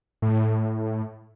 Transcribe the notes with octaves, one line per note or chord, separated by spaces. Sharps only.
A2